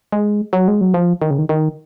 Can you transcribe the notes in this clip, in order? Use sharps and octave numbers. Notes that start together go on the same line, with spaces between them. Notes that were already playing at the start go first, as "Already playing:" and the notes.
G#3
F#3
G#3
F#3
F3
D#3
C#3
D#3
D#3